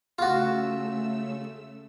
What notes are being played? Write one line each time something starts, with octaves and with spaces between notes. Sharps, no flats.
C#3 A3 F4 F#4 E6